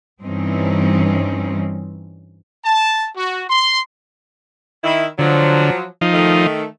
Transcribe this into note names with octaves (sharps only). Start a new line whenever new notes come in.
G2 E3 G3 C4 C#4 D#4
A5
F#4
C6
D#3 E4
D3 F3 F#3
F3 D#4
D#3 A3